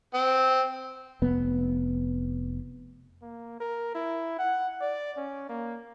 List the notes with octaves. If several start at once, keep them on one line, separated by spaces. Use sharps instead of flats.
C4
F1 B3
A#3
A#4
E4
F#5
D5
C#4
A#3